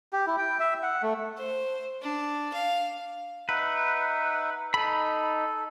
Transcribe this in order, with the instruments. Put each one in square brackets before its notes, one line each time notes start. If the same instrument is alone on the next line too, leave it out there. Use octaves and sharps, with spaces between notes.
[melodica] G4
E4
G5
E5
F#5
A3
[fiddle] C5
D4
F5
[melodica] D#4 E5 F#5 [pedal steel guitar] B4
[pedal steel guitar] D#4 B5 [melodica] A4